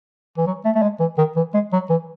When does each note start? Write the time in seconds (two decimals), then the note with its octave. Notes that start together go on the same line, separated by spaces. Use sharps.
0.37 E3
0.47 F#3
0.65 A3
0.76 A3
0.82 G#3
1.00 E3
1.18 D#3
1.36 E3
1.54 G#3
1.73 F#3
1.90 E3